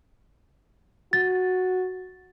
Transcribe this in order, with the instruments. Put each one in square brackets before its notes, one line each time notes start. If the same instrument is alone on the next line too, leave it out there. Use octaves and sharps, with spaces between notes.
[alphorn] F#4 [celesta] A6